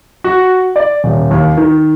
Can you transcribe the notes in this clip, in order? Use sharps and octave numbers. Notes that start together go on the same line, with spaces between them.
F#4
D5
D#1
D#2
D#3